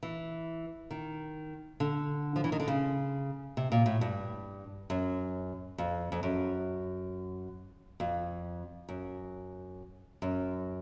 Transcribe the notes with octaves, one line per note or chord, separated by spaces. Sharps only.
E3
D#3
D3
F3
E3
D#3
D3
C#3
C3
A#2
A2
G2
F#2
F2
F2
F#2
F2
F#2
F#2